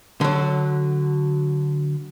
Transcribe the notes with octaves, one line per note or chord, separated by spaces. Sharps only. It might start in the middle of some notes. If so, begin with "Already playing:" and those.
D3 F#3